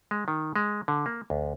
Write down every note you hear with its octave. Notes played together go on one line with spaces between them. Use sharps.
G#3
D#3
G#3
D3
A#3
D2